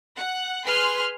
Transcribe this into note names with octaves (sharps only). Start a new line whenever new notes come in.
F#5
G#4 B4 C6 F6